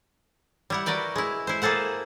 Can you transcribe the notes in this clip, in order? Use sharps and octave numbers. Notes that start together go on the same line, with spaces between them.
G3 E4 F#5
F#4 A#4 B4 D5 G5
G#3 E4
E4 C5
A#3 G#4 A4 C5 F#5